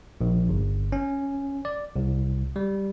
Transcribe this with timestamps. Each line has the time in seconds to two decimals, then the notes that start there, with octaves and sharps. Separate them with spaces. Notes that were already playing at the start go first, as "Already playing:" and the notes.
0.21 A#1
0.49 G1
0.92 C#4
1.65 D5
1.96 C2
2.56 G3